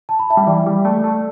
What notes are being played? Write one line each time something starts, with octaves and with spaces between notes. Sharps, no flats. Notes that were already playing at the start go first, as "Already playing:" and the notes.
A5
B5
E5 A5
G3
E3 D5 G5
G3
A3 A4 D5
A3